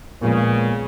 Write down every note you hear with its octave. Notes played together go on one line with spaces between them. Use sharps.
A#2 C#3 F3 G#3 B3